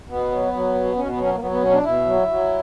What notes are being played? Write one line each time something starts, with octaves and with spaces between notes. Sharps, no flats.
B2 B3
F#3
F#3
B2
B2 C#4
B3
F#3 C#4
A#3
F#3 B3
B3
B2 C#4
D4
B2 E4
F#3
F#3